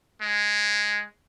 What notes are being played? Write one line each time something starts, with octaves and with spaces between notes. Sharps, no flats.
G#3